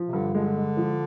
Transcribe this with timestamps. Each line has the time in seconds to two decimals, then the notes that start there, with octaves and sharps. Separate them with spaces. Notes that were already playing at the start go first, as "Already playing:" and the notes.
Already playing: F3
0.08 C3
0.13 G2 D3
0.34 D3 G#3
0.56 G#3
0.77 F3